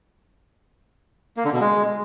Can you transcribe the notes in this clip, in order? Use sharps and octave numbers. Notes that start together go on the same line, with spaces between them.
A#3
D3
B2
G#3